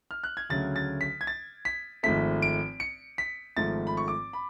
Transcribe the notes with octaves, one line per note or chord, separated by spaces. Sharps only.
F6
F#6
G#6
D2 C#3 F#3 A3 A6
A6
B6
G#6
A6
B6
G#1 G#2 F3 A3 B6
D7
C#7
B6
G#1 G#2 F3 A3 A6
B5
C#6
D6
B5